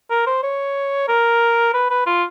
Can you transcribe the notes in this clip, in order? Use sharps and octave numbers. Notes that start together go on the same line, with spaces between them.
A#4
C5
C#5
A#4
B4
B4
F4